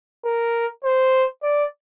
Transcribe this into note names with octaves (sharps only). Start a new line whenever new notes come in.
A#4
C5
D5